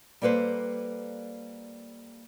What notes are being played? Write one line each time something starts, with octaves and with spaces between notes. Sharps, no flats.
G3 A#3 A4 B4 C5